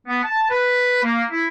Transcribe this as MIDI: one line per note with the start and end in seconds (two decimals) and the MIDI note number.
0.07 0.22 59
0.23 0.50 81
0.50 1.01 71
1.03 1.24 58
1.31 1.46 64